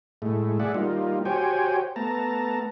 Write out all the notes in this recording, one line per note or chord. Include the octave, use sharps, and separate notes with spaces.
A2 G#3 A3
G#4 D5 E5 F#5
G3 A#3 D#4 F4
F#4 G4 C5 C#5 G5 G#5
A3 B3 A5 A#5